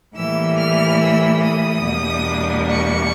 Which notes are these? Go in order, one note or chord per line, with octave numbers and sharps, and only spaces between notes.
A2 E3 G3 A#3 E6
F6
E6
D#6
E2 B2 G3 A#3 D4
C#6